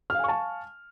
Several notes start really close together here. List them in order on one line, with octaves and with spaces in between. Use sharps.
F6 F5 G#5 C#6 A5